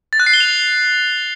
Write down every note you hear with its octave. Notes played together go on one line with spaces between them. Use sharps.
A6
F#6
C7
G7
F7